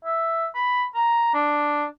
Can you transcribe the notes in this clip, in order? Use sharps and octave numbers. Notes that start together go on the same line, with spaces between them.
E5
B5
A#5
D4